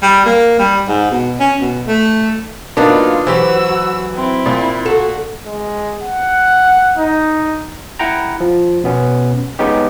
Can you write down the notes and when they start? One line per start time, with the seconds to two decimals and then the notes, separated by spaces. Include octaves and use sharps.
0.02 G3
0.26 A#3
0.59 G3
0.88 G#2
1.11 B2
1.40 C#4
1.61 B2
1.87 A3
2.77 F#3 A#3 B3 D4 D#4 F4
3.27 E3 F#3 F#4 G4 C5 E6
4.15 C4 E4
4.46 A#2
4.85 F#4 A4
5.46 G#3
6.02 F#5
6.97 D#4
7.99 E4 F#5 G5 A#5
8.40 F3
8.84 B2 B3 C#4
9.59 G#3 B3 C#4 D#4 G4